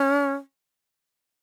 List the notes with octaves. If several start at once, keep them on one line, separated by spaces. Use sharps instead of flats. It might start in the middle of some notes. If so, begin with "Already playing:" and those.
Already playing: C#4